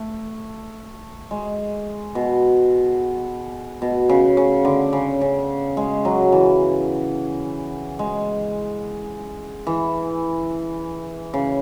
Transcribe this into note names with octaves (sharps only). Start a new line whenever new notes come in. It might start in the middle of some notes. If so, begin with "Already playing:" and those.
Already playing: A3
G#3
B2
B2
C#3
C#3
D3
C#3
C#3
G#3
F#3
E3
G#3
E3
C#3